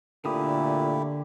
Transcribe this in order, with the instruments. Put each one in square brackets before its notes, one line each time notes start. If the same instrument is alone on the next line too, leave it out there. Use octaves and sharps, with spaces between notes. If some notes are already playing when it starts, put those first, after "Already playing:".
[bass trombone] A#2 [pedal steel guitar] D3 D#6 [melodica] A3 E4 G4